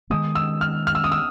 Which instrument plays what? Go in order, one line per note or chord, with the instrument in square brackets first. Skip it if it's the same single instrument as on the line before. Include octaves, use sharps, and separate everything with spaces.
[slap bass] D#3 G#3 B3 [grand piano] D#6
[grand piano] E6
F6
F6
E6
D#6
E6